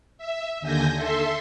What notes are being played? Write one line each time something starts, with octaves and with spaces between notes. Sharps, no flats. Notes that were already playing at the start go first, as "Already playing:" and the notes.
E5
D#2 D3 G#5 G6 A#6
A4 E5 C6